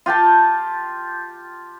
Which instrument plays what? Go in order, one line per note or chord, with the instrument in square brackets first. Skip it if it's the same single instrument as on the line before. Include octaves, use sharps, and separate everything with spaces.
[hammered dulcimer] F4 G4 G5 A5